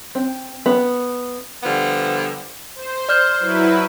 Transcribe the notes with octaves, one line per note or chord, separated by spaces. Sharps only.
C4
B3
D3 F3 G3 B3
C5
D5 F6 G6
F#3 E4 B4